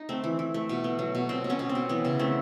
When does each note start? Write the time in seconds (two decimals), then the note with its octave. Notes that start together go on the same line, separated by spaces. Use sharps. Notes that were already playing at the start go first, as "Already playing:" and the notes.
Already playing: D#4
0.09 A3 C4
0.24 E3
0.39 E3
0.54 A3
0.69 B2
0.84 B3
0.99 F#3
1.15 B2
1.29 B2 C4
1.44 B2
1.49 B3 C#4
1.59 B2
1.69 C4
1.75 B2
1.89 E3 B3
2.05 C#3
2.19 A3 C4